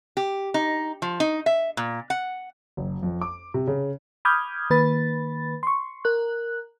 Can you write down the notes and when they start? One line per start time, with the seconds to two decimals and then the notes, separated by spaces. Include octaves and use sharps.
0.17 G4
0.54 D#4
1.02 F3
1.20 D#4
1.46 E5
1.77 A#2
2.10 F#5
2.77 F#1
3.03 F2
3.21 D6
3.54 C3
3.67 C#3
4.25 B5 D6 D#6 F6 G6 G#6
4.70 D#3 A#3 B4 B5 A6
5.63 C6 C#6
6.05 A#4 F#6